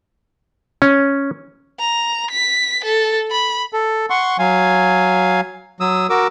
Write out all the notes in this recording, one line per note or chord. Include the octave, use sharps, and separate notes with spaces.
C#4
A#5
B6
A4
B5
A4
F#5 C6 C#6
F#3 F5 G#5
F#3 D#6 E6
F#4 A#4 D6 E6